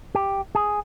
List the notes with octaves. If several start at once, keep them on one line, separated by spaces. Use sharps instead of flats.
G4
G#4